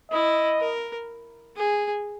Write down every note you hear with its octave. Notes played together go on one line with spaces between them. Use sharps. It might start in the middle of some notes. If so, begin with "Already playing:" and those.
E4 D#5
A#4
G#4